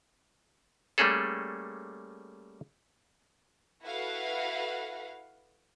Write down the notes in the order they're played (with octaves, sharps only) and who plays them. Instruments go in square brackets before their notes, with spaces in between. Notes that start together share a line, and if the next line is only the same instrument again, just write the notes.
[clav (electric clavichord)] G3 A3 A#3 C#4 G#4 A4
[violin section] E4 F#4 A4 B4 F5 F#5